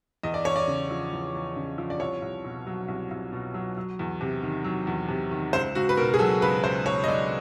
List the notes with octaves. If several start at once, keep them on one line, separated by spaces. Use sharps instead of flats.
E2 D#5
D5
E2 C#5
D5
C#3
F3
E2
E2
C#3
F3
D5
C2 C#5
C2
B2
F#3
C2
C2
B2
F#3
F#3
E2
C3
D#3
F#3
E2
C3
D#3
C#2 C5
C#2 F#4
B4
B2 A#4
G#4
F#3 A4
C#2 B4
C#2 C5
B2 C#5
D#5
F#3 D5